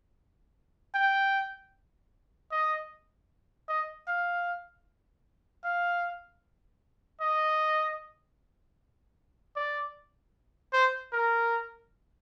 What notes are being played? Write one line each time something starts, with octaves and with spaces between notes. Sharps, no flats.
G5
D#5
D#5
F5
F5
D#5
D5
C5
A#4